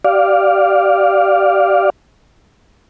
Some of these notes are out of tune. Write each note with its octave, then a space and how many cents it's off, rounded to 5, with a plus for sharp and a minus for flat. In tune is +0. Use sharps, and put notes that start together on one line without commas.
G4 -25 D5 +0 F5 +5